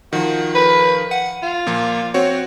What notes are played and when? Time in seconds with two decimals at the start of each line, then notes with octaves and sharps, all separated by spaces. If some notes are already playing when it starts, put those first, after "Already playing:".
0.13 D#3 F3 F#4
0.55 B4
1.11 F#5 D#7
1.43 F4
1.67 A#2 F3 A#3
2.14 C4 F#4 C#5